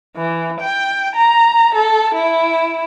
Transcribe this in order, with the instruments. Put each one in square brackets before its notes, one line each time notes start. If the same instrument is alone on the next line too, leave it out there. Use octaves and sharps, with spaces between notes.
[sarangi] E3
G5
A#5
A4
E4